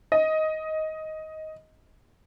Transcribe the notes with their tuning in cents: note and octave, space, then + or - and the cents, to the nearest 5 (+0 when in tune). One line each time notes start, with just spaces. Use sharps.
D#5 +10